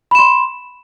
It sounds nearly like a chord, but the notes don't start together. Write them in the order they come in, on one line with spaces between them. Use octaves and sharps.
B5 E7 C6